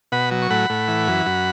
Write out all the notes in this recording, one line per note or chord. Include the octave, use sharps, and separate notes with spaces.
B2 F#5 B5
F#3
C#6
A2 F#5 B5
A2
E3
F#2
F#2